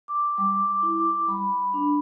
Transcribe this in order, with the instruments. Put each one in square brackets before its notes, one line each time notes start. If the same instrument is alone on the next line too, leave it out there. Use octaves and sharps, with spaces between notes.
[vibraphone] D6
G3 D6
D6
E4
D6
G3 B5
D4